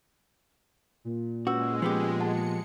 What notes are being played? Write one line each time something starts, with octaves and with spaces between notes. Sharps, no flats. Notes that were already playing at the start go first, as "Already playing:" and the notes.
A#2
G#3 C#4 F#4 B4 E6
F3 B3 G4
F#5 A5 C#7